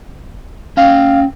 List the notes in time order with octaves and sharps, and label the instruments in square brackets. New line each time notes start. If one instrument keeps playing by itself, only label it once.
[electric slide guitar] C#4 G5 [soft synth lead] F5